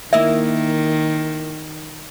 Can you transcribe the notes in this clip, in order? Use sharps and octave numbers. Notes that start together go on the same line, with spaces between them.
D#3 A#3 E4 D#5 E5